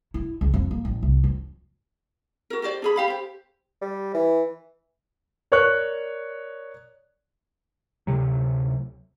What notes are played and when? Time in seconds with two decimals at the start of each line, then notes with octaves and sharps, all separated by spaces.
0.14 E4
0.41 C#2
0.54 F2
0.71 A#3
0.85 A1
1.03 C2
1.24 F2
2.50 F#4 A#4
2.62 F#4 G4 C5 D5
2.82 D4 G#4 B5
2.96 G4 F5 B5
3.08 G4 C5
3.82 G3
4.14 E3
5.52 A#4 C#5 D5 C#6 F#6
8.07 D2 C3 F#3